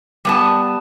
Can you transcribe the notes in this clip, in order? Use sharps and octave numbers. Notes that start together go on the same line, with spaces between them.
G3 B3 A5